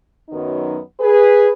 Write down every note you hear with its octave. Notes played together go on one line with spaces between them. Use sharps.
F#2 D#3 F#3 B3 D#4
G#4 B4